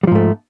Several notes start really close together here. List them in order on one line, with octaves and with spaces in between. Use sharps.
G3 F3 G#2 A3